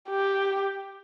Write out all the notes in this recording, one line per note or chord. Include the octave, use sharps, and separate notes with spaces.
G4